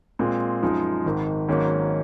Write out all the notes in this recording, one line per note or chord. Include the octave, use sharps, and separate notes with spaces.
A#2 G#3 C4 F4
F#2 F3 G#3 D#4
G#1 G#2 D#3
G#1 G#2 F#3 A#3 C#4